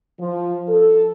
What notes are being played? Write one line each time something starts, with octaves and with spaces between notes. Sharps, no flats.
F3
A4